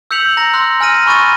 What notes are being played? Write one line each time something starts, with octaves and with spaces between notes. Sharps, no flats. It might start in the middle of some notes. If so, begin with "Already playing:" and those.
E6 G6 B6 C#7 F7 F#7
A#5 A#6
C6 E6 F#6
G#5 F6 A#6 D#7
B5 C#6 F#6 A6 D#7